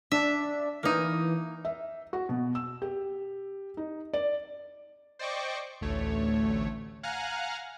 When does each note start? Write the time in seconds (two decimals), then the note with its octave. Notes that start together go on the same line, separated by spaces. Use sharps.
0.12 D4 E5
0.83 E3 A#3 D#4
1.65 E5
2.13 F#4
2.29 B2
2.55 E6
2.82 G4
3.77 D#4
4.13 D5
5.19 C5 D5 D#5 G5 C#6 D6
5.81 A1 D2 A3 C#5
7.03 F5 F#5 G#5 A#5 F6 F#6